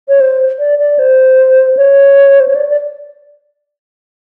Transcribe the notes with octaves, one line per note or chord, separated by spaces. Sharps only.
C#5
C5
D5
D5
C5
C#5
C5
C#5
D5
D5